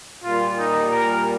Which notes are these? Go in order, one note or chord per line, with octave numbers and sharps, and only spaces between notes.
A#2 G3 F4
D#4
A#4